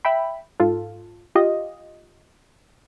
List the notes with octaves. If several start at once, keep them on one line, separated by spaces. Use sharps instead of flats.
E5 G5 B5
G#2 F4 A4
F4 G4 D#5